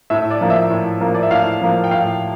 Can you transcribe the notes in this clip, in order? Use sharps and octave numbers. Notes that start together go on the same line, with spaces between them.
A2 E5
D5
F3 A#3
E5
A2
F3 A#3
D5
E5
A2 F5
F3 A#3
G5
A2 F5